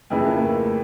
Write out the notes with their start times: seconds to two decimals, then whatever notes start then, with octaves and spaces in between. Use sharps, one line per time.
0.10 F2 C#3 E3
0.24 A#3
0.36 A3